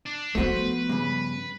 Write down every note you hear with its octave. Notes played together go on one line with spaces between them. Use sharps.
D4
F3 A3 B3 F#4 B4 C5
G2 C#3